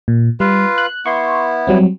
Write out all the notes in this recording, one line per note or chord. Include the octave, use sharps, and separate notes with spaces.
A#2
G3 F4 B4 F5
F#6
B3 E4 C6 C#6
F#3 G3 C4